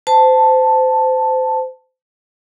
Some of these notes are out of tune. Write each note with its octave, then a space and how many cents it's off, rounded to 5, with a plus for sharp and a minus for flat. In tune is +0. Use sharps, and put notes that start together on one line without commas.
C5 -25 A5 +0